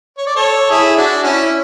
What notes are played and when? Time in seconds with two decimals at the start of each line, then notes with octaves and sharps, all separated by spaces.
0.18 C#5
0.27 D5
0.36 A4 C#5
0.70 E4 G#4
0.97 D4 F#4
1.23 C#4 E4